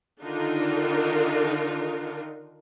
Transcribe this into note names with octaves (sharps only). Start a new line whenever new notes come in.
D3 D#3 D4 D#4 F4 A#4